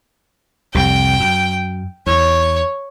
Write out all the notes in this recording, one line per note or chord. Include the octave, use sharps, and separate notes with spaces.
C2 F2 C3 G5
F#2
E2 C#5